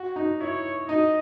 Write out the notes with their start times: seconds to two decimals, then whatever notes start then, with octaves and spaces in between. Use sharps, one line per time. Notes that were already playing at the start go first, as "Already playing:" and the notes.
Already playing: F#4
0.16 D#4
0.40 E4 C#5
0.89 D#4 D#5